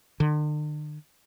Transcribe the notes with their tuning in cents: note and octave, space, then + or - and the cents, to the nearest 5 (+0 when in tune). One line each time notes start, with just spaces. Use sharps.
D3 +45